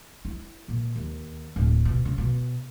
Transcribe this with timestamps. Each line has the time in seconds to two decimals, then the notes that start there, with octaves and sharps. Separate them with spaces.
0.25 E4
0.68 A#2
0.96 D#2
1.56 D1
1.85 B2
2.05 C#3
2.18 B2